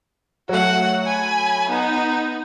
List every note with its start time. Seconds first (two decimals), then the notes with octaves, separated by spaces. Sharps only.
0.49 F#3 A3 F#4 F#5
1.07 G#5 B5
1.70 B3 D#4